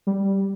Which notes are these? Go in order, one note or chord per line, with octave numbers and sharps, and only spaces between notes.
G3